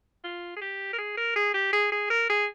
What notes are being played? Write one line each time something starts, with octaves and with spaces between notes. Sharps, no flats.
F4
G#4
G4
A#4
G#4
A#4
G#4
G4
G#4
G#4
A#4
G#4